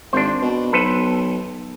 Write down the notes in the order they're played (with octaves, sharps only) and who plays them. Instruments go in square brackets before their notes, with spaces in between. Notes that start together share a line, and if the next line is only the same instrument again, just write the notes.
[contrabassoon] G#1 [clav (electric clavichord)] D4 C5
[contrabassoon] B2
[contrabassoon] B1 [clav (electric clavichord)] A4 B4 C5